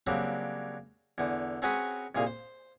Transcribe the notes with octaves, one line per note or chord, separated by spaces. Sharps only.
C#3 F#3 G3 A#3 C4 D4
E2 D3
C4 C#4 F#4 G#4 B4 C#5
C2 A#2 G#4 F5
C5